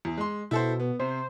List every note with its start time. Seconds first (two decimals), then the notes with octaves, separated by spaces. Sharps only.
0.05 E2
0.18 G#3 C6
0.51 B2 E4 A4 C5
0.80 B3
0.99 C3 C5